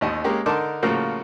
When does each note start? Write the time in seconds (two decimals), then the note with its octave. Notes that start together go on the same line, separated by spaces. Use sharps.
0.01 A1 D#2 D#5
0.24 G#3 A#3 C#4 G4
0.46 D3 D#4 A#4 A5 C6 D6
0.83 A2 C#3 F3 A#3 F#4